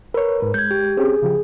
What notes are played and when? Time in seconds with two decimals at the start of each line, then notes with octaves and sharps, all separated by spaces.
0.14 A#4 B4 C#5
0.41 G#2 B4
0.54 G#3 G6 G#6
0.71 G4
0.97 C4 C#4 G4 G#4
1.22 C#3 F3 G4